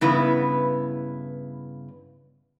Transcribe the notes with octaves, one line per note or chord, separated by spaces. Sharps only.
G2 C#3 B3 E4 B4